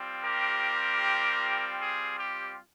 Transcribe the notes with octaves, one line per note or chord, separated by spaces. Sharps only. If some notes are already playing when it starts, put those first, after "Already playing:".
Already playing: G3 C4 F4
G4 A#4
G#4
G4